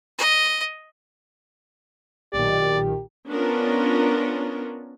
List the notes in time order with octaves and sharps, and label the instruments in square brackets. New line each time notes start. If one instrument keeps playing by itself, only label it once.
[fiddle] D#5
[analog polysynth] B1 A#2 D#3 [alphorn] G4 [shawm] D5
[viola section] B3 C#4 D4 F4 A#4